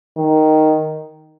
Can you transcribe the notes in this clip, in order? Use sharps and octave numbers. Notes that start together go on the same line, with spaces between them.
D#3